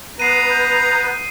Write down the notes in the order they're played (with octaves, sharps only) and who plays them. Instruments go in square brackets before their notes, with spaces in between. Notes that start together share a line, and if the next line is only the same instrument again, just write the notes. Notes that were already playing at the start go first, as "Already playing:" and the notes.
[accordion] B3 B4 [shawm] A#5 [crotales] D#6 C7 D#7
[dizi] G6